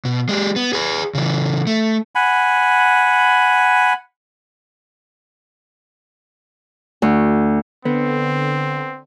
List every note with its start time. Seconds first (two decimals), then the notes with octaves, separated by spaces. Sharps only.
0.05 B2
0.29 G#3 G4
0.56 B3
0.73 G#4 B4
1.15 C#3 E3
1.67 A3
2.15 F#5 G#5 B5
7.02 D2
7.85 D3 B3 C4